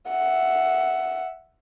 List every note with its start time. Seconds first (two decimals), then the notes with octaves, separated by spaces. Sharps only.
0.10 E5 F#5